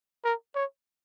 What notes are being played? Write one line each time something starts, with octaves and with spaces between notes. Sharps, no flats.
A#4
C#5